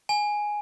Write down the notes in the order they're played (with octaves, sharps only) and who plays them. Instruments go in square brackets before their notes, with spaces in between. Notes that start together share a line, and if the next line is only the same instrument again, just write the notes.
[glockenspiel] G#5